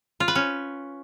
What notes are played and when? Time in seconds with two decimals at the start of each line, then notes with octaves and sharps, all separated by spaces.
0.20 F4
0.28 B4
0.35 C#4